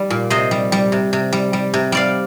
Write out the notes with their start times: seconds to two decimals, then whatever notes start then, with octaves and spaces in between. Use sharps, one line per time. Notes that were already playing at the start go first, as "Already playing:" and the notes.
Already playing: G3
0.10 A#2
0.30 C3 C5 D#5
0.51 G3
0.72 G3
0.92 C3
1.13 C3
1.33 G3
1.53 G3
1.74 C3
1.92 G3 D5 F5